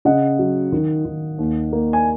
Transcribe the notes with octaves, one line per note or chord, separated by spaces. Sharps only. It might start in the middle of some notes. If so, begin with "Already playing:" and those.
C#3 D#5 F#5
F#3
D#3
D#3
D#2
A#3
G#5